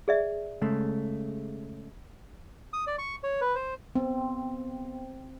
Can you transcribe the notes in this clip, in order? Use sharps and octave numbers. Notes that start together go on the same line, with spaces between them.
G#4 D5 E5
C#3 G#3 A3
D#6
D5
C#6
C#5
B4
C5
B3 C4